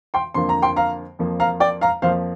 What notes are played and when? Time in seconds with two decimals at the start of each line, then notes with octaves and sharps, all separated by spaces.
0.14 G5 C6
0.34 F2 D3 F3 A#3 C6
0.49 A#5
0.62 G5 C6
0.76 F5 A#5
1.19 F2 F3 A#3
1.40 F5 A#5
1.60 D5 G5
1.81 F5 A#5
2.02 F2 F3 A#3 C5 F5